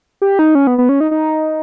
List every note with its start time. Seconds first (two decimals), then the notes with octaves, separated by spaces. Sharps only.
0.22 G4
0.39 D#4
0.55 C#4
0.67 B3
0.78 B3
0.89 C#4
1.00 D#4
1.11 D#4